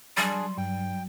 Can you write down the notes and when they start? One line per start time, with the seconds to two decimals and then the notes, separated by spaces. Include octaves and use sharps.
0.17 F#3 G3 D4 G#4 C6
0.58 G2 G5